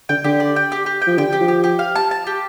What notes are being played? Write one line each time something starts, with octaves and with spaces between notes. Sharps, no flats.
D3 G5
D3 G4
D5
G5
G4
G4
G5
F3
D3 G5
G4
F3
G4
G4
F5
A5
A5
G4